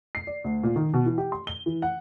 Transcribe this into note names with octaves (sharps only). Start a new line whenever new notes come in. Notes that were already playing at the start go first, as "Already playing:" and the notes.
C7
D5
D2
A#2
D#3
B2
E3
G4
C6
G7
E3
F#5